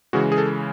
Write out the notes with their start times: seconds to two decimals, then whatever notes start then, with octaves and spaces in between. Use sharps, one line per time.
0.13 C#3 E3 G#3 F#4
0.32 G#4
0.38 A4